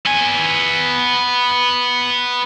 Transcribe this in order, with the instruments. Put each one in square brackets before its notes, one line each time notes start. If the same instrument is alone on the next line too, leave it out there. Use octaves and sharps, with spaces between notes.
[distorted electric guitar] B3 G#5